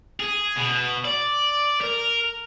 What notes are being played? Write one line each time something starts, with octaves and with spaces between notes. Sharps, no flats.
G#4
B2
D5
A#4